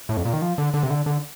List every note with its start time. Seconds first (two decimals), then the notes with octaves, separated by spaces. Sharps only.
0.09 A2
0.17 F2
0.25 A#2
0.33 D#3
0.42 F3
0.58 D3
0.74 D3
0.83 C3
0.90 D3
1.06 D3